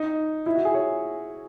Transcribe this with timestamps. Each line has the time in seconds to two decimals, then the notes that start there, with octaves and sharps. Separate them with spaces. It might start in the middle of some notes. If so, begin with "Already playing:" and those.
Already playing: D#4
0.46 E4
0.55 F#4
0.65 G#4
0.75 C#5